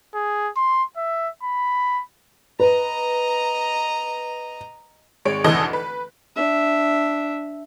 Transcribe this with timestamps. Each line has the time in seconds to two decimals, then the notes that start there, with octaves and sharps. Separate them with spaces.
0.14 G#4
0.57 C6
0.97 E5
1.43 B5
2.60 B4 D#5 A#5
5.25 G#1 G#3 C#5 D7
5.44 F1 D2 E3 A4 D#5
5.73 B4
6.36 D4 E5